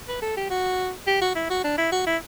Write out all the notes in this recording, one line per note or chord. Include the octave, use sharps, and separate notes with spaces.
B4
A4
G4
F#4
G4
F#4
E4
F#4
D4
E4
F#4
E4